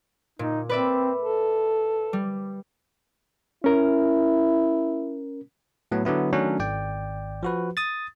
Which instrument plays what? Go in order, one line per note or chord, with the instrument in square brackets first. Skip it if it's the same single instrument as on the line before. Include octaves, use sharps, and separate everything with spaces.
[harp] A#2 [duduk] D#4
[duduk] C4 [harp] B4 D5 E5
[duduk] A4
[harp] G3
[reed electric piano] C#4 A#4 [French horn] E4
[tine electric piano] A2 F#3 B3
D3 F#3 B3 E4
D#3 F#3 A3 C#4 D4
G#1 D5 G5
F3 F#4 B4
D#6 A6